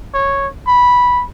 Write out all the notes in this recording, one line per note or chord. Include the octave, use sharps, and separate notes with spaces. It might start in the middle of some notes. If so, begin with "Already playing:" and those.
C#5
B5